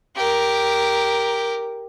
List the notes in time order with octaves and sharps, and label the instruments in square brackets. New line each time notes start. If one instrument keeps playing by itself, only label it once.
[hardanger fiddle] G4 A#4